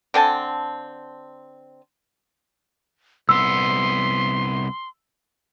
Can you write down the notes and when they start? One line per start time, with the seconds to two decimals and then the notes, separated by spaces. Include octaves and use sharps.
0.14 D3 C4 G#5 A5
3.29 C2 B3 C6 E6